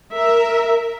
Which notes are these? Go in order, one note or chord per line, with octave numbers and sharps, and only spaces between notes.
A#4 E5